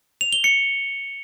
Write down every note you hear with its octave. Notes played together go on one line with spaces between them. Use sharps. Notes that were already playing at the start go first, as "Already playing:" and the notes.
F7
G7
C#7